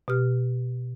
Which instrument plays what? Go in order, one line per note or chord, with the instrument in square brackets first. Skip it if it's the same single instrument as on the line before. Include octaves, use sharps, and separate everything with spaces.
[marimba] B2 G4 F6